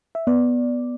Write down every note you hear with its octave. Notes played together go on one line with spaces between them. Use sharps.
E5
B3 D5